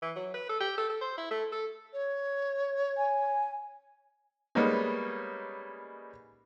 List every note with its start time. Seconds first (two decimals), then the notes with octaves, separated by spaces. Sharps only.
0.02 E3
0.16 F#3
0.34 B4
0.49 A4
0.60 G4
0.78 A4
0.90 A4
1.01 C5
1.18 E4
1.31 A3
1.52 A4
1.93 C#5
2.97 G#5
4.55 G3 G#3 A#3 B3 C#4 D#4